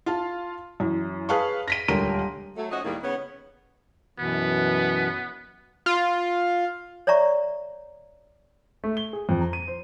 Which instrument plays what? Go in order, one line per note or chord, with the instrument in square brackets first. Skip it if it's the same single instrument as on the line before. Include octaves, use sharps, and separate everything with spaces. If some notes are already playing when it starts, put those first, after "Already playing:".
[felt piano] F4 F5 A5
F#2 E3
G#4 B4 F5 A5 C#6
A#6 B6 D#7
D#1 C#2 D3 A#4 C6 D#7
[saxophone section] F#3 A3
F3 C#4 D#4 F#4 D#5
D#2 A2 D#3 G3 G#3 A#3
C#3 B3 C#5
[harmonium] F#2 B2 E3 [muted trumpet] B3
[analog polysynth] F4
[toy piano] C#5 D5 E5 A#5 C#6
[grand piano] A3
G7
G#4
F2
A#5
D#7
C5